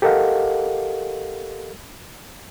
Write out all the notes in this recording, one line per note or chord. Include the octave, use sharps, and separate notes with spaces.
G4 A4 A#4 D#5 F5 F#5